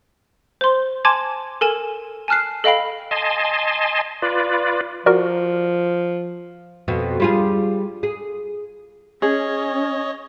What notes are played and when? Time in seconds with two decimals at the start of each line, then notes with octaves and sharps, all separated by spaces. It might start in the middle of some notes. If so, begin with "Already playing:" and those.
0.61 C5 C6
1.05 G#5 A5 C6 D6 G#6
1.61 A4 A#4 G#5 E7
2.28 G#5 A5 F6 F#6 C7
2.64 A4 D#5 F5 G5 B5 C7
3.11 D#5 G#5 A5 C6
4.22 F4 B4 D5
5.06 F3 F#4 A#4 D5
6.88 F2 B2
7.20 G3 F4 G#4
8.03 G#4
9.22 C#4 G#4 C#5 D#5